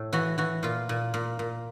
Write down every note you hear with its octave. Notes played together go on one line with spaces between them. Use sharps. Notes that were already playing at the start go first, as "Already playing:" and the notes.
Already playing: A2
E3 F#4
E3 F#4
A#2 F4
A#2
A#2
A#2